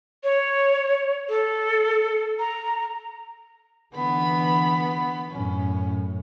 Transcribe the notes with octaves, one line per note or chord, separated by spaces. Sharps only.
C#5
A4
A#5
D3 E3 B3 B5
F#2 A2 C#4